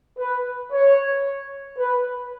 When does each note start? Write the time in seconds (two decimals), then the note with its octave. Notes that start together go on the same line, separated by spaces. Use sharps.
0.18 B4
0.71 C#5
1.77 B4